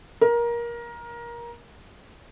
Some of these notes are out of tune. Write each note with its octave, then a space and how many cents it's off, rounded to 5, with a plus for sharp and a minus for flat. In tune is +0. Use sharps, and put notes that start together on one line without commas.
A#4 +20